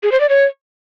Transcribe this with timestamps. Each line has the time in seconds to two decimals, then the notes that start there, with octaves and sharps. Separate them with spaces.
0.03 G#4
0.12 C5
0.21 D5
0.29 C#5